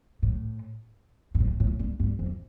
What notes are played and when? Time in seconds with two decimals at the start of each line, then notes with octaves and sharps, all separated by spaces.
0.22 A2
1.34 G2
1.40 A2
1.60 A2
1.79 G2
2.00 G2
2.19 F2